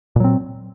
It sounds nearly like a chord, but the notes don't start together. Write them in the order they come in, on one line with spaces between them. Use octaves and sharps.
A#2 F#3 C4